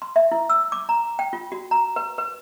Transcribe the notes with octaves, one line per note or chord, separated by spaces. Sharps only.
C6
E5
E4
E6
D6
A#5
G5
F4
F#4
A#5
B4
B4